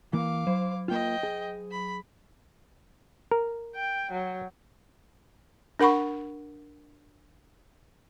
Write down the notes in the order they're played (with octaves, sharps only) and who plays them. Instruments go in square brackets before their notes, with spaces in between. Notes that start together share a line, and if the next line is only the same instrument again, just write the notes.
[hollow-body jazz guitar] E3 A#3 [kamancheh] F5 D6
[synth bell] F#3 [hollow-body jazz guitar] C5
[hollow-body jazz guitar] A#3 F4 [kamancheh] D#5 G5
[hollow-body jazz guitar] G#4
[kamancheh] B5
[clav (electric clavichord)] A#4
[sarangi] G5
F#3
[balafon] D4 A#4 F#5 B5 C#6